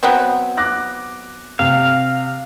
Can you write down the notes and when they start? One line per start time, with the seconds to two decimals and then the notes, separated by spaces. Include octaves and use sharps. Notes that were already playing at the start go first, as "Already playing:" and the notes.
0.03 F#3 B3 C4
0.57 D6 F#6 A#6
1.59 C3 F5